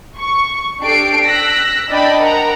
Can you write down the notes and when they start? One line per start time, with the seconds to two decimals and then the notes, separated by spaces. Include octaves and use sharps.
0.18 C#6
0.81 D4 G4 A4 C7 D7
1.24 E6 F#6 A#6 B6
1.89 D4 D5 D#5 G5 B5
2.21 A#4 F#5 A#5